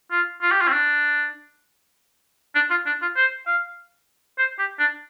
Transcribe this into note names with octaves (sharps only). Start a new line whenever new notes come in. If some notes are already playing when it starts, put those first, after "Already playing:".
F4
F4
G4
F4
C4
D4
D4
F4
D4
F4
C5
F5
C5
G4
D4